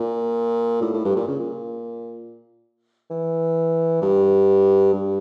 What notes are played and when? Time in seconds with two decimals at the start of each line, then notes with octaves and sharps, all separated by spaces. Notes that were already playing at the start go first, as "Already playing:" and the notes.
Already playing: A#2
0.82 A2
0.93 A2
1.05 G2
1.16 A#2
1.28 C#3
1.39 A#2
3.11 E3
4.02 G2
4.93 G2